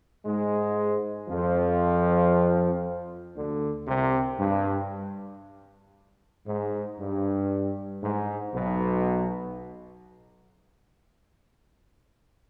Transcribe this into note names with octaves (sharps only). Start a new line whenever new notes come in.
G#2 G#3
F2 F3
D2 D3
C2 C3
G2
G#2
G2
G#2
B1 B2